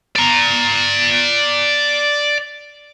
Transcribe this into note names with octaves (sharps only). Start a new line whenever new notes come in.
D5 A#5